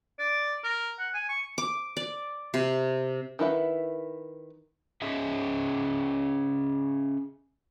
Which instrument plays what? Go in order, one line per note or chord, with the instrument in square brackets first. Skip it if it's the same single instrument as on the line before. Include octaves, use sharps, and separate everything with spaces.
[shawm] D5
A#4
F#5
G#5
C#6
[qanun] D6
D5
C3
[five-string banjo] D#3 E4 B4 E5 F#5
[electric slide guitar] C#4 G#4 D#5 E5